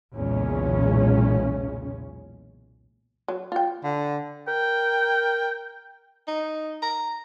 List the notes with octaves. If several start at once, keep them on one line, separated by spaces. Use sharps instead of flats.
B1 E2 A#2 C#3 G#3 C#4
F#3
F4 G5
D3
A#4 G5
D#4
A#5